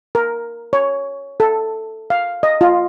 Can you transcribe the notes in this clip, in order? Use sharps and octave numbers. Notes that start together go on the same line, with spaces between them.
A#4
C#5
A4
F5
D#5
F4